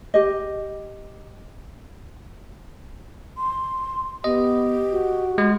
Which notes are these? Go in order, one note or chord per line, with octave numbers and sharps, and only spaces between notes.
G4 D#5
C6
B3 G4 D#5
F#4
G#3